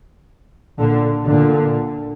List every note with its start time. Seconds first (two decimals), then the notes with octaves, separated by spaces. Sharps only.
0.78 A#2 D3
1.28 A#2 D3